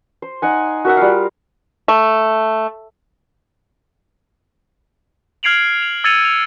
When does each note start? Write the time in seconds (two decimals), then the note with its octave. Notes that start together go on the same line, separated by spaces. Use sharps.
0.22 C5
0.42 D#4 F#5 G#5
0.85 F#4 A#4 E5 F#5
0.97 G3 F4 F5
1.88 A3
5.43 F6 G#6 C7 D7 F7 F#7
5.82 F7
6.04 E6 G#6 A6 C#7 D#7 F7
6.25 F7